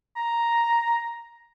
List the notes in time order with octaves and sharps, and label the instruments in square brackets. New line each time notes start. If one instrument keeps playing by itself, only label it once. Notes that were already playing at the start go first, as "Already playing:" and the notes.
[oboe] A#5